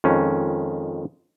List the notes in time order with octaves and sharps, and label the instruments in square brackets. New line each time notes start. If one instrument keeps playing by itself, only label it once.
[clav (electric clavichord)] F2 D#3 G#3 C#4